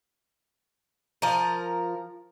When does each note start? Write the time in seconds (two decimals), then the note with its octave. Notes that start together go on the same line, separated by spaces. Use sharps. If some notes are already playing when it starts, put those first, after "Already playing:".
1.22 F3 A#4